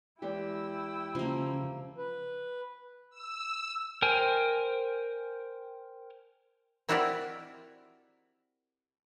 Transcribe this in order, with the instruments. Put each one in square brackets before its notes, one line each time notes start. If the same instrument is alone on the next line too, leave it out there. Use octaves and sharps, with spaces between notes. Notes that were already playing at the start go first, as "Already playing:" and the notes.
[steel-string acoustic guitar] E2 G#3 G4 [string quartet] E4 G5 E6
[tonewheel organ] C#3 [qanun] F3 A#3
[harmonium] B4
[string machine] E6
[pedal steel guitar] A#4 C5 G5 G#5
[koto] C4 E4 F#4 G4 A#4 D5